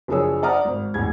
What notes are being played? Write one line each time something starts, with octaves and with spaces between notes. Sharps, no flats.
F#1 F3 D4 G#4 C#5 E6
C5 D5 F#5 A#5 D#6 F6
G#1
A1 E2 G#6